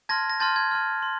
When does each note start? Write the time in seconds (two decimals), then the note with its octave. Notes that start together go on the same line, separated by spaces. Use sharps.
0.09 A5 C6 F6 G#6 A#6
0.30 A#6
0.40 A5 C6 F6 G6 A6
0.56 G#6
0.71 A5 C6 F6
1.02 C6